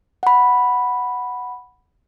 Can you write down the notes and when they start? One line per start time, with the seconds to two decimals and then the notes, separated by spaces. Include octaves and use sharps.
0.23 F#5 B5